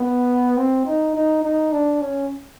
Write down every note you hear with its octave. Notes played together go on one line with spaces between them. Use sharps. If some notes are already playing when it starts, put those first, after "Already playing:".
Already playing: B3
C4
D#4
D#4
D#4
D4
C#4